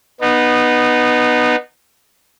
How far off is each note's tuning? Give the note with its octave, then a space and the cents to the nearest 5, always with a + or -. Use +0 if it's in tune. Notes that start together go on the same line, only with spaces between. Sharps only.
B3 -5 D#4 -25